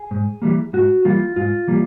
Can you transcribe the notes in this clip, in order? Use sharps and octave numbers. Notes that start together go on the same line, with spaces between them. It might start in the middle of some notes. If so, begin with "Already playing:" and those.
Already playing: G#4
G#2
E3 G3 A#3
G#2 F#4
E3 G3 A#3 F4
G#2 F4
E3 G3 A#3